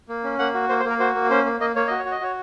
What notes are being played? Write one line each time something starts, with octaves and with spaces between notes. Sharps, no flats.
A#3
C#4
A#3 F#5
F#4
A#3 C5
C5
A#3 A#4
F#4 C5
A#3
C#4 C5
A#3
A#3 D#5
A#3 C#5
F#4 D#5
C#5
F#4
D#5
F#4 C#5